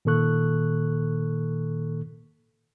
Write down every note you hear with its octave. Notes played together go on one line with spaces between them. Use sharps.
A#2 D#3 A#3 A4 C#6 F#6